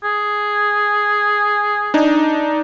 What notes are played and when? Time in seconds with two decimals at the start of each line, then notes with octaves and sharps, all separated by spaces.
0.04 G#4
1.94 D4 D#4